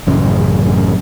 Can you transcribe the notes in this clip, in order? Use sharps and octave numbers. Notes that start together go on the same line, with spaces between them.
A1 F#2 C#3